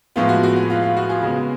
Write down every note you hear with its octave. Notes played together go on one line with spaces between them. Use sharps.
A2 F3 G#3 B3 F4
F#4
F#4
F#4
F4
F4
F#4
F4 G#4
C#3 G#3 B3 F#4